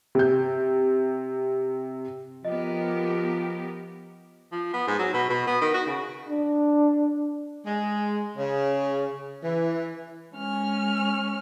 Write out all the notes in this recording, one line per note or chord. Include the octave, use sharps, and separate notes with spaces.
C3 G6
F3 B3 G4 A#4 D#5
F3
B3
G#2
F#3
B2
B2
B3
D#3
F#4
C#3
D4
G#3
C#3
E3
G#3 C#4 F6